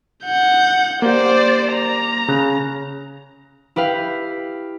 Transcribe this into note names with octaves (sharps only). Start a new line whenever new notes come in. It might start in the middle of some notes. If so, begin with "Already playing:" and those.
F#5 G6
A#3 G4 C5 D5
A#5
C#3 F#6
E4 G4 B4 F5